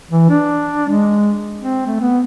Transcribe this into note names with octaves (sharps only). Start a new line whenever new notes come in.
E3
D4
G#3
C4
A3
B3